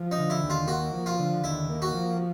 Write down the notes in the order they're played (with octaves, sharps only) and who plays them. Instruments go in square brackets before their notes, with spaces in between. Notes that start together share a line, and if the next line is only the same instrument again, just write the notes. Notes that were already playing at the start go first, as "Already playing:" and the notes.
Already playing: [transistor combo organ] F3
[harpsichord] D#4
[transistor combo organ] D3
[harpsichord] E4
[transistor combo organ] D#2
[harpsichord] F4
[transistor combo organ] A#3 [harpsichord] F#4
[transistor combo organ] F3
[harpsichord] F4
[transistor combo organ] D3
[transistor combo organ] D#2 [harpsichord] E4
[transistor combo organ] A#3
[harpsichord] F#4
[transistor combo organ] F3